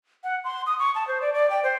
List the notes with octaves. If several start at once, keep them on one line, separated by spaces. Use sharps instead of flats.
F#5
C6
D#6
C#6
A5
C5
D5
D5
G5
C5